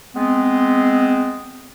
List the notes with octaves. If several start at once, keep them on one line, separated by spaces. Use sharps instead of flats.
G#3 B3 C4